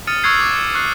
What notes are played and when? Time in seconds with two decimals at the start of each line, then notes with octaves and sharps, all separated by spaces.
0.07 D#6 F6 A6 C#7 D#7
0.24 C#6 D#6 E6 F#6 G#6 C7
0.41 D6 E6
0.56 C#7
0.75 C#6 F#6 C7 C#7